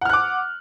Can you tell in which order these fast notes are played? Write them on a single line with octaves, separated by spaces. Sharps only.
F#5 F6 F#6 D6